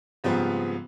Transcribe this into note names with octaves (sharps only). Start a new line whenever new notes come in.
G#2 C#3 F3 G3 B3 C4